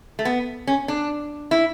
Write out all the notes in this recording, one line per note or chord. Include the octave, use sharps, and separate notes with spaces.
A3
B3
C#4
D4
E4